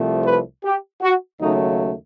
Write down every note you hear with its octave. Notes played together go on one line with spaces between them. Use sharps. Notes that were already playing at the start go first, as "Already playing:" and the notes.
Already playing: C2 C3 F3 A3
B4
G4
F#4
D#2 C#3 F#3 A3 D#4